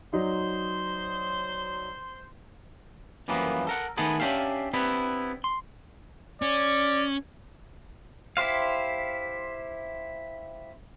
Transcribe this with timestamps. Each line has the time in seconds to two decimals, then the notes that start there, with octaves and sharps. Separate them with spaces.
0.13 F#3 D#4 C5 D5 C6
3.28 F#2 E3 F3 G3 A#3 B3
3.67 A4 A#4 F#5
3.97 D#3 A3 B3 G#4 A4 B4
4.20 C#4 D4 G4 E5 F5
4.73 B3 C4 D4 E4 G4 B4
5.44 C6
6.42 C#4 D5
8.37 E4 G4 C5 F5